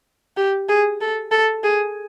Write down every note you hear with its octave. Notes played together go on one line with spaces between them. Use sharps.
G4
G#4
A4
A4
G#4